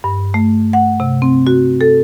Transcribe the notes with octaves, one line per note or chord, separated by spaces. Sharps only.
G2
A3
F#5
C3
C4
F#4
A4